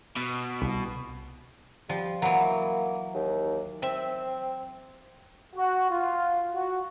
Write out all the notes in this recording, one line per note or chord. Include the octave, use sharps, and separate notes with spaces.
B2
C2
F3 G3
E3 F#3 A#3
D#2
C4 E5
F#4
F4
F#4